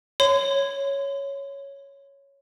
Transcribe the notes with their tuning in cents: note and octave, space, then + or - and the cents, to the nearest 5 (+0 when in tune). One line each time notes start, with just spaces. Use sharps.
C#5 +0 C6 -45